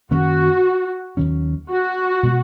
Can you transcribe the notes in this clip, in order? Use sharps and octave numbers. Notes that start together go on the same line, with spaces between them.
F#2 D#3 A#3 C#4 F#4
D#2 D#3 F#3 C#4
F#4
B2 G#3